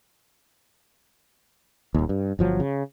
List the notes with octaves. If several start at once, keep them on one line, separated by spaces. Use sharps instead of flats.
D#1 D#2
G2
G1 F3 F#3
C#3